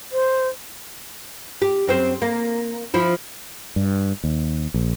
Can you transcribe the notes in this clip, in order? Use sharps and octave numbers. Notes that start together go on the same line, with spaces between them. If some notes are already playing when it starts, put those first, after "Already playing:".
C5
G4
F#2 C4 C5
A#3
F3 E4
G2
D#2
A#1